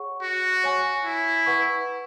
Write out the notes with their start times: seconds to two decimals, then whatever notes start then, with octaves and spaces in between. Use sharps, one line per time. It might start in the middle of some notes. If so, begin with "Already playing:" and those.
Already playing: G#4 C#5 F#5 C#6
0.22 F#4
0.64 C#5 G#5 C#6
1.05 E4
1.46 B4 F#5 C#6